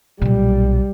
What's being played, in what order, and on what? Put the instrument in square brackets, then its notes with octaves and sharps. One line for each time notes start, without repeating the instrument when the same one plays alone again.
[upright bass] B1 A#2 [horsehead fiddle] G3